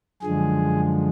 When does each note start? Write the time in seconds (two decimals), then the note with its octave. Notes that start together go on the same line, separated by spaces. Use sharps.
0.22 F#2 D3 F3 G#3 G#4